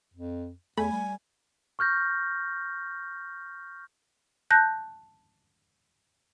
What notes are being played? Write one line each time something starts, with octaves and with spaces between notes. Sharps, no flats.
F2
E2 A3 G#5 B5
G3
C#6 F6 G6 A#6
A5 F#6 G6 A#6